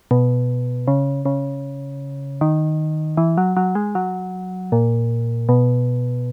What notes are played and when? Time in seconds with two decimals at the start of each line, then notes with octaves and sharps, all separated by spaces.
0.11 B2
0.87 C#3
1.25 C#3
2.41 D#3
3.17 E3
3.37 F#3
3.57 F#3
3.75 G#3
3.95 F#3
4.72 A#2
5.49 B2